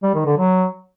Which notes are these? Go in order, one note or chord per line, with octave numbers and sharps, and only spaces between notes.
G3
D#3
D3
F#3